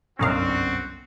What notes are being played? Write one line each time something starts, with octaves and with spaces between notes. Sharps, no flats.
G1 C2 F#2 C4 C#4 D#4 F#4 F5